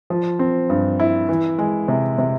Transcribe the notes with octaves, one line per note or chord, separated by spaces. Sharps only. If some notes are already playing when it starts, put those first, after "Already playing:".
F3
C4
G2
E4
E3
G#3
C3
C3